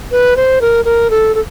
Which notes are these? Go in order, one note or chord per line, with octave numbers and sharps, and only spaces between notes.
B4
C5
A#4
A#4
A4
A4